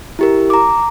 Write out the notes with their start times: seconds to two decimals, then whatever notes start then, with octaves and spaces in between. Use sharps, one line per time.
0.19 E4 G4 A#4
0.50 A#5 D6